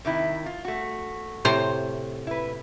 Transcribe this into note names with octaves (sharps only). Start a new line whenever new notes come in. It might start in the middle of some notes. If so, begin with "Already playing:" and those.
C3 D#3 E4
F4
A3 F#4
A2 C3 C5
E4 B4